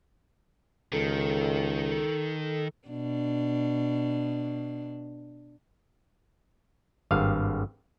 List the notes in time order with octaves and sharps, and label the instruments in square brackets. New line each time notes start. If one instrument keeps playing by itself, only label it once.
[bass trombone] C#2 [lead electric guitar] D#3 [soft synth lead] A4
[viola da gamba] B2 D4
[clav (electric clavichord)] G#1 G2 F5